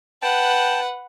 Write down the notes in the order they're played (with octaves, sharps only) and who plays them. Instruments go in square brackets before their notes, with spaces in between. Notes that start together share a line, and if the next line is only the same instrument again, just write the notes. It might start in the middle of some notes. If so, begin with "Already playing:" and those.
[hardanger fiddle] B4 F#5 [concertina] G5 A5